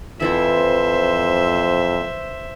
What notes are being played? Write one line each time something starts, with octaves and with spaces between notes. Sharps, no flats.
F2 E3 F3 E4 C5 E5